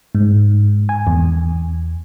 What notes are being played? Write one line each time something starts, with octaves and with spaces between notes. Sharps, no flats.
G#2
G#5
E2